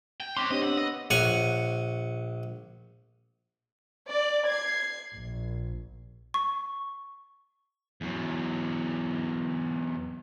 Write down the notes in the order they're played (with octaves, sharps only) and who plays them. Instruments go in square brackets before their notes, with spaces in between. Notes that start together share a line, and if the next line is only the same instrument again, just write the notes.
[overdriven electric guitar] G5
[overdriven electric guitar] C4 C#4 [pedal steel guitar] C6 [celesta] D6 F#6 B6
[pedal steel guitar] C4 [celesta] D4 G4 C#5 [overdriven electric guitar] D#5
[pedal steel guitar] B3 E6 [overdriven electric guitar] F#5
[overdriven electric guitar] D#5
[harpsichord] A#1 C#5 F#5 G#5
[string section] D5
G#6 C7
A#1
[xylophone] C#6
[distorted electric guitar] E2 F#3